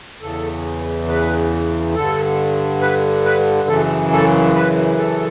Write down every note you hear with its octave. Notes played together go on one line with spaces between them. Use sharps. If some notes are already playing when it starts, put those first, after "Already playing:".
E2 C#3 E3 A4
B4
G2 D3 A4
B4
B4
F#2 C#3 E3 A4
A4
B4
A4